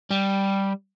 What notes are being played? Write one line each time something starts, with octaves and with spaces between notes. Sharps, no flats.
G3